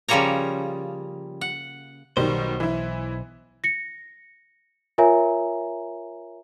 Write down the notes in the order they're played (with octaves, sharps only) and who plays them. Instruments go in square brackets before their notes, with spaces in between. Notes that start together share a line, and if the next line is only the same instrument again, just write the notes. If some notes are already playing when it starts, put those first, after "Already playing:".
[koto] C#3 F3 G3 A#3 C#5 A#5
F#5
[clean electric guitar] B1 C5 [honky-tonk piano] B2 D#3 G3
[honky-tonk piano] E3 E4
[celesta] A#6 C#7
F4 A#4 C#5 E5 G#5 A#5